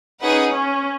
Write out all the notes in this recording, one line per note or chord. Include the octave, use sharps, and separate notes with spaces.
C#4 D#4 G#4 B4 F#5
C#4